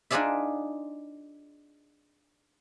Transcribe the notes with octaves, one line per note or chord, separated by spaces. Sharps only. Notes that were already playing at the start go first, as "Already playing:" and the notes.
D4 D#4 F4 G#4 D5 E5